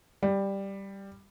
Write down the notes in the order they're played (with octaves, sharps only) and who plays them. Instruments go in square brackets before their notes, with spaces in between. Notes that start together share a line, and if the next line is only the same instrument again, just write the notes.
[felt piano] G3